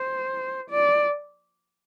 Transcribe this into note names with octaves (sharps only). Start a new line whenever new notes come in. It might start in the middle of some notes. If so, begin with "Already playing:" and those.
Already playing: C5
D5